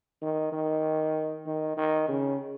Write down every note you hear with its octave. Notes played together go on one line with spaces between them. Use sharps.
D#3
D#3
D#3
D#3
C#3